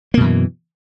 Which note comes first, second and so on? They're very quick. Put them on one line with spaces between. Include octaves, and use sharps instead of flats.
A#3 B2 F#2 E3